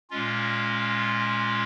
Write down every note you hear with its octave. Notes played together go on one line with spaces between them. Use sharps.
A#2 G#3 C#4 F4